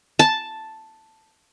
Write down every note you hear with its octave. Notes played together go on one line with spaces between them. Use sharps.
A5